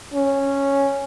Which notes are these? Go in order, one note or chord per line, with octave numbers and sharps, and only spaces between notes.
C#4